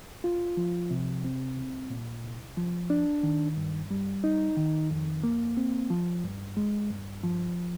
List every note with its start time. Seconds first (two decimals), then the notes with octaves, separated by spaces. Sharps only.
0.24 F4
0.57 F3
0.91 C3
1.24 C4
1.57 C2
1.90 A#2
2.24 C2
2.57 F3
2.90 D4
3.23 D#3
3.57 G2
3.91 G3
4.24 D#4
4.57 D#3
4.91 F2
5.24 A#3
5.57 C4
5.90 F3
6.24 G2
6.57 G#3
6.90 G2
7.24 F3